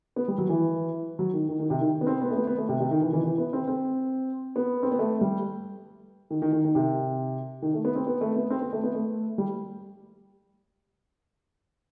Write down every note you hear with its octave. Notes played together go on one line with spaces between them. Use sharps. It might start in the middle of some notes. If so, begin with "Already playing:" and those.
B3
G3
F#3
E3
F#3
D#3
D#3
D#3
C3
D#3
B3
C4
B3
A3
B3
B3
A3
C3
C3
D#3
E3
E3
E3
B3
C4
C4
B3
C4
B3
A3
G3
D#3
D#3
D#3
D#3
C3
D#3
A3
B3
C4
B3
A3
B3
C4
B3
A3
B3
A3
G3